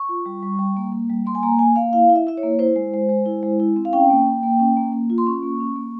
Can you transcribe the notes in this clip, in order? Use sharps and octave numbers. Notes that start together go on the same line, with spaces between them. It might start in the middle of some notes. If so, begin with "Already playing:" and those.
Already playing: C#6
F4
G3
G3
G3
A#3
A#3
G3
A#3 C6
G#5
A#3 A#5
A#3 G#5
A#3 F5
E4 F5
E4
E5
E4 E5
C#5
A#3
E4 C5
G#3
G#3
G#3
E4
G#3
E4
C4
F5
C#4 G5
A#3
A#3
A#3
C#4
A#3
A#3
F4
C6
C#4 C#6
A#3
C#4
A#3